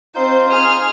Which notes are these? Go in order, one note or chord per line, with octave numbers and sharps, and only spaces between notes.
C4 D#4 F4 C5 G6
G#4 F6